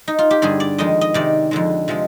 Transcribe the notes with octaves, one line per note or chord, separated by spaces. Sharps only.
D#4
F4
G4
G2 D3 G3 G#4
D5
F2 D#3 G#3 D#5
D#5
C3 D#3 G#3 D5
F2 D3 G#3
C3 F3 G#3